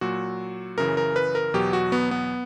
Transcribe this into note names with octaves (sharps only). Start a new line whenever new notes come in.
A#2 F#3 F#4
F#2 C#3 E3 A#4
A#4
B4
A#4
E2 B2 F#3 G4
F#4
B3
B3